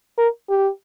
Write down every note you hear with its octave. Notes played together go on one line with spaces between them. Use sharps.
A#4
G4